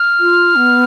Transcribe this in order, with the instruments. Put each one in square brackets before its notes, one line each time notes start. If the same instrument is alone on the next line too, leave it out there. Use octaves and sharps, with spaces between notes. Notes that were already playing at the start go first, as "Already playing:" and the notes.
Already playing: [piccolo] F6
[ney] F4
B3